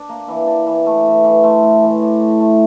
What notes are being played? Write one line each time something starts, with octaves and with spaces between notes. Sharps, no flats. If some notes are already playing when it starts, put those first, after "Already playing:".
Already playing: D4
A#3
E3
D4
E3
A3
E3
E3
A3 C6
A2
E3
A2 D6
A2
A3